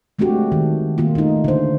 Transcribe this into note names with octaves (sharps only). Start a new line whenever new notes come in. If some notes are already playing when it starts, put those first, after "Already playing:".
G#3 A3 C4 D4 F#4 G4
D#3
D#3 A#3 F4
A3 D#4
D3 C5